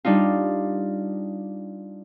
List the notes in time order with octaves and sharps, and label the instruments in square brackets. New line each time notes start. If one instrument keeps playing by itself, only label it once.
[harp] G3 D4 D#4 F4